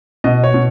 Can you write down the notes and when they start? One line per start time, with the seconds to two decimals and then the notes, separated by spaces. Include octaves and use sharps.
0.24 B2 D#5
0.44 C#5
0.54 B2